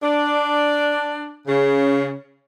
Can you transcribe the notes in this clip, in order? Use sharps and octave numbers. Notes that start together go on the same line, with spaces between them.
D4
C#3